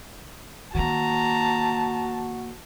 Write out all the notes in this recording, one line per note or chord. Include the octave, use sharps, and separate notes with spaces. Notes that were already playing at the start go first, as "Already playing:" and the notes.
D#3 A#3 F#4 A5 A#5